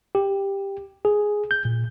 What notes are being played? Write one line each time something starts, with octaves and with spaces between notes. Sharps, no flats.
G4
G#4
G6
A#2